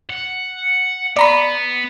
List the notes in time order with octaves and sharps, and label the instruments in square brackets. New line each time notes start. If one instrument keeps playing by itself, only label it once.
[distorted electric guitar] F#5
[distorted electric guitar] B3 [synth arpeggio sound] D5 A#5 B5